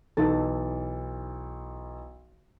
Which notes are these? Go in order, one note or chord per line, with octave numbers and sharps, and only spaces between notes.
B1 E3 D#4 A4 A6